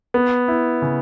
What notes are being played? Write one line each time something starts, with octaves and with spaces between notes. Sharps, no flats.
B3
E4
C#3